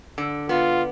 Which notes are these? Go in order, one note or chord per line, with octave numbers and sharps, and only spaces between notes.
D3
B3 F4